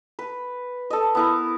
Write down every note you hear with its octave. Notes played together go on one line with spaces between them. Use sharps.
B4
A4 D#5
B3 E4 A#4